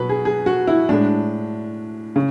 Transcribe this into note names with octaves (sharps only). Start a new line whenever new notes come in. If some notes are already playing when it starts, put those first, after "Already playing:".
Already playing: B2 F#3 B4
G#4
G#4
F#4
E4
A2 G#3 D4
C#3